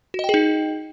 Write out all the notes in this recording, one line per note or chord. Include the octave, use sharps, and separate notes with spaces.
D#4 F#4 G#4 D#5 G5